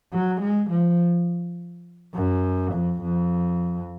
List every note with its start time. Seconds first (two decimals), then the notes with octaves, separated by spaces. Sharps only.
0.13 F#3
0.41 G#3
0.70 F3
2.15 F#2
2.74 F2
3.02 F2